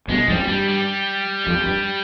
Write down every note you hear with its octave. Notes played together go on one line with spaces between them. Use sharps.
G2 B2 G#3
F2 G#2 G3
G2 G3
G3
F2
G2